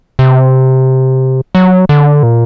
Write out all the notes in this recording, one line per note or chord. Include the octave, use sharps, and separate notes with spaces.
C3
F#3
D3
A#2